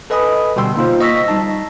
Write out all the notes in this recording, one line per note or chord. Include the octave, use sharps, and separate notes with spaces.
A4 B4 D#5 G#5 B5 D#6
B2 D3 G3 G5 C6 E6
A#3 D#4 F4 C5
D#5 C#6 E6 A#6 B6
G3 D#4 A5